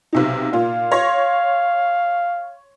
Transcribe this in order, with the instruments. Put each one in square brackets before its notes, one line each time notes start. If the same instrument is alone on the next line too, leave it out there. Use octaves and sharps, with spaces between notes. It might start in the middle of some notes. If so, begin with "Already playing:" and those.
[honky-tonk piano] B1 C3 D#4
[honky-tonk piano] A#2 F4 [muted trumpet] F5
[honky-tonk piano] C#5 C6 A#6